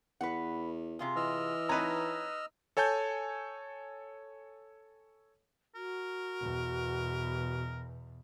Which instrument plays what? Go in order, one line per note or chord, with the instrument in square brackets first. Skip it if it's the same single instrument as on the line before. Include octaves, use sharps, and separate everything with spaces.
[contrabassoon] E2 [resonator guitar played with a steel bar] B4 F#5
[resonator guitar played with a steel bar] C3 F4 G#4
[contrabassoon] E3 [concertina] D#5 E6 F6
[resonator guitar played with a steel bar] C4 C#5 A5 [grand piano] D#4 B4 A#5
[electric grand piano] A4 C#5 G#5 A5 G6
[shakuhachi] F#4 [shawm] A#4
[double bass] E2 B2